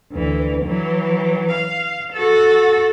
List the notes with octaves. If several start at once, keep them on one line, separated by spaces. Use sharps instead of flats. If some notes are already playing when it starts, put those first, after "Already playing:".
D2 E3
E3 F#3
F5
F#4 A4